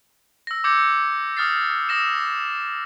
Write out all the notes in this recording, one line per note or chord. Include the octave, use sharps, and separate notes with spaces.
E6 A#6
D6 E6 G6 G#6 C#7
D#6 F6 A6 C7
D#6 E6 A#6 E7